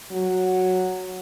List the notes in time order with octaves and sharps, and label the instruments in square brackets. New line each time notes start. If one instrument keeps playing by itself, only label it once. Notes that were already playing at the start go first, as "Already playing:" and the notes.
[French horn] F#3